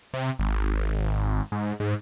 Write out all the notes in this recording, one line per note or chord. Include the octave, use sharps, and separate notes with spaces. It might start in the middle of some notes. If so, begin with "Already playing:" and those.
C3
G#1
G#2
G#2